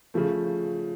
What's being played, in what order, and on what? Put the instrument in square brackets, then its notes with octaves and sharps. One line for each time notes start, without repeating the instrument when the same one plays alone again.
[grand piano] C#3 F3 A3